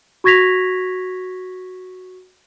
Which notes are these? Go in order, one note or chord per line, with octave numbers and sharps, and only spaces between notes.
F#4 C#6 G#6 A#6 B6 F7